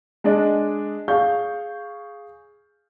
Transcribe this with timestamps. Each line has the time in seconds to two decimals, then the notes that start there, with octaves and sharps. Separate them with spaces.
0.24 G#3 D4 D5 D#5
1.08 G#4 D5 F5 C#6 G6